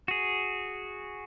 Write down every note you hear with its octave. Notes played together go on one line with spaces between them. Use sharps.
F#4 G#4